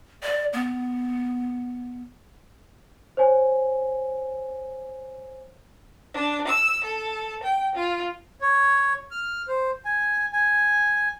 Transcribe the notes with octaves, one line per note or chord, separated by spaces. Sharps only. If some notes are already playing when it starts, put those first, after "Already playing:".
D5
B3
C5 C#5 G#5
D4
E6
A4
G5
F4
C#5
F6
C5
G#5
G#5